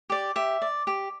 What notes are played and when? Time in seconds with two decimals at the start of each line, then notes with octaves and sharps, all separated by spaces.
0.10 G4 D5
0.36 G4 E5
0.62 D5
0.87 G4